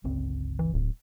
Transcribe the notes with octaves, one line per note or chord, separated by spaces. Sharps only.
G1 C#2 C4
E3
D1